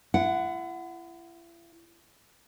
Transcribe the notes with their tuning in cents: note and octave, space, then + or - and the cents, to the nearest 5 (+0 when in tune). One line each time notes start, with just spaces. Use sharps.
E4 +40 F#5 +0